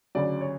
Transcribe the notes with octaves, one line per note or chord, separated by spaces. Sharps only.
D2 C#3 F#3 D5
C#5